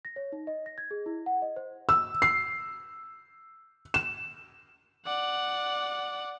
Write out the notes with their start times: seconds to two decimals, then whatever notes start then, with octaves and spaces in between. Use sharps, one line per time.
0.05 A#6
0.16 C#5
0.32 D#4
0.47 D#5
0.66 A#6
0.78 G#6
0.91 G#4
1.06 E4
1.26 F#5
1.42 D#5
1.56 C5
1.89 E6
2.22 C7
3.94 E7
5.05 D5 F#5